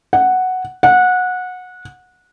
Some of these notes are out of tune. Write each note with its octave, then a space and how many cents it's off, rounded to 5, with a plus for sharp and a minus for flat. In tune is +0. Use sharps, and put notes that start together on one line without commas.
F#5 +0
F#5 -20